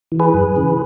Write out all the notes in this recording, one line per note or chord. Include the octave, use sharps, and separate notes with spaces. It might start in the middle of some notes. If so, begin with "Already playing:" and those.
E3
G#4 B4
F#2
C#3 E3